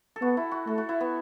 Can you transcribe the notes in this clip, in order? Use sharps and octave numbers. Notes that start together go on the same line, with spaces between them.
A4
B3 F#4
E4
F#4
A3 A4
F#4
E4
B3